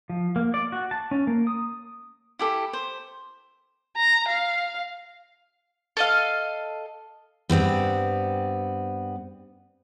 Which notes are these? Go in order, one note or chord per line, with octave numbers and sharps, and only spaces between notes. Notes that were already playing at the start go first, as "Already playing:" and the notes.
F3
A#3
D5
F#4
A5
C#4
A#3
D#6
E4 G4 A4
C5
A#5
F5
A4 D#5 F5
G2 B3 C4 D5